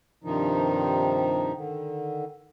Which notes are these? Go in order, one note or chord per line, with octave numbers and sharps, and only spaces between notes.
G2 C3 D#3 F3 D#4
D3 D#3